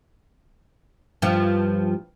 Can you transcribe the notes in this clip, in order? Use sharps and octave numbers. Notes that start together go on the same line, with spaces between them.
G2 F3